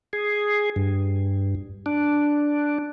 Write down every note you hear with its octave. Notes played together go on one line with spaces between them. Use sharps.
G#4
G2
D4